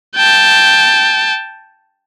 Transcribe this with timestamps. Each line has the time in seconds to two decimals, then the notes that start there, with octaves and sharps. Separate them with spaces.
0.16 G5 A5